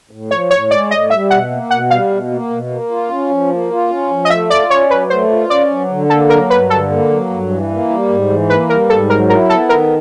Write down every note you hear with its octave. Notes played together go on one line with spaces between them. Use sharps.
A2
F3 C#5
A2 C#5
G#3 D5
A2 D#5
G3 E5
B2 F#5
A#3
B2 F#5
G3 F5
B2
A#3
B2
A#3
F4
C#4
F3
A#3
F4
C#4
F3
D#5
A3 E5
F4 D5
C#4 C#5
F#3 B4
A3 C5
F4
C#4 D5
F#3
D3
A#3 A4
F#3 A#4
G2 B4
D3 A4
A#3
F#3
G2
E3
A#3
G3
G#2
E3
A#3 B4
G3 A#4
G#2 A4
F#3 A#4
E4 A#4
B3 A4
D#3 A#4